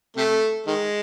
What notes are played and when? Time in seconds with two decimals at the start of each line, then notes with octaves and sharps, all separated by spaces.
0.17 C3 A3
0.67 D#3 G#3